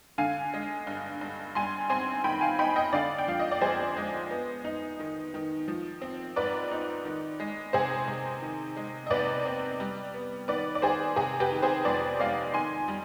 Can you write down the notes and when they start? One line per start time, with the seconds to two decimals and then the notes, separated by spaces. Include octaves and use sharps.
0.18 D3 F5 G#5
0.54 G#3
0.87 G2
1.21 G2
1.55 G3 G#5 C6
1.90 C4 G#5 C6
2.24 D#3 G5 B5
2.41 F5 G#5
2.59 D#4 G5 B5
2.76 D#5 G5
2.93 D3 D5 F5
3.19 G5
3.28 F3 F5
3.39 D#5
3.51 D5
3.61 F2 G#4 C5
3.97 G#3
4.31 B3
4.64 D#4
4.99 D#3
5.34 D#3
5.68 F3
6.02 C4
6.36 G#2 B4 D5
6.71 D#4
7.05 D#3
7.40 G#3
7.73 C3 G#4 C5
8.08 C3
8.42 D#3
8.77 G#3
9.07 D#5
9.10 C3 B4 D5
9.45 C4
9.80 G3
10.14 B3
10.48 D#3 B4 D5
10.75 D5
10.82 D#3 G#4 C5
11.16 C3 G#4
11.40 G4 B4
11.52 D#3
11.63 G#4 C5
11.85 F2 B4 D5
12.19 G#3 D5 F5
12.54 D#3 G#5 C6
12.88 G3